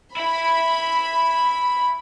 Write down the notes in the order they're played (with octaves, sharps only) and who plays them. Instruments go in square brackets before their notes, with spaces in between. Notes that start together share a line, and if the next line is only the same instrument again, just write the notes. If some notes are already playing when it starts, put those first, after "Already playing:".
[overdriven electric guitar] E4 E5 [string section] B5